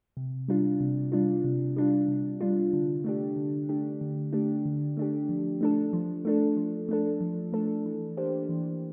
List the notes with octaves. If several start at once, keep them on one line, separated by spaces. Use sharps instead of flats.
C3
G3 D4 F4
C3
G3 D4 F4
C3
G3 D4 F4
C3
G3 D4 F4
D3
A3 D4 G4
D3
A3 D4 G4
D3
A3 D4 G4
D3
A3 D4 G4
F3
A3 D4 A4
F3
A3 D4 A4
F3
A3 D4 A4
F3
A3 D4 A4
E3
A#3 D4 G4 C5
E3